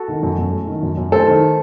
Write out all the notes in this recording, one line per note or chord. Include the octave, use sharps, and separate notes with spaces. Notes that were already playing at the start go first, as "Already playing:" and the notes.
Already playing: F#4 A4
D#3
F#2
F#2
A3
D#3
F#2
F#2
A3 A4 C5
D#3